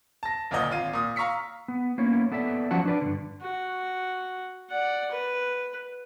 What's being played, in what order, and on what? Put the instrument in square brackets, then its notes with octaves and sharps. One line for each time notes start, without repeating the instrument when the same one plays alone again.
[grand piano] A5 A#6
F#1 D2 A#2 D#5
G#1 F4 D#7
A#2 D#6
F5 A#5 C#6 E6 B6 C#7
[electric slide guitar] B3
A#3 B3 C#4 E4 C#5
B3 A4 D5 E5
F3 F#3 C#4 F#4 F#5 A5
D4 B4 D5
G2 D3
[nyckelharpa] F#4
D5 F#5
B4